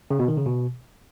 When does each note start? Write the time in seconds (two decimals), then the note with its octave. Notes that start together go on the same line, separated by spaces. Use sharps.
0.11 C#3
0.19 B2
0.28 D#3
0.37 C#3
0.46 B2